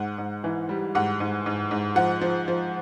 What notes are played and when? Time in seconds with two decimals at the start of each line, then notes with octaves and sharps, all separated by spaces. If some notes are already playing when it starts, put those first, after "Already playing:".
Already playing: G#2 F#5
0.18 G#2
0.44 E3
0.69 G3
0.95 G#2 F#5
1.20 G#2
1.46 G#2
1.71 G#2
1.96 F3 F#5
2.21 F3
2.48 F3